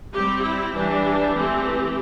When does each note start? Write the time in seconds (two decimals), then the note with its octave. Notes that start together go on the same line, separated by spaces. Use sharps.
0.14 G3 C4 G4
0.43 E4
0.74 E3 G3 D4 G4
1.33 E3 A3 C4